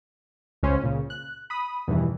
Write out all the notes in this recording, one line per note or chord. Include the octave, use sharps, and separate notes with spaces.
C#2 C#4 C5
A#2 C#3
F#6
B5 D#6
E2 G2 B2 D#3 E3